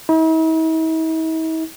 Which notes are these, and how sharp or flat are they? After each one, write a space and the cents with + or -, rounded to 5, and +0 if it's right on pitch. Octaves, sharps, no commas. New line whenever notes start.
E4 -45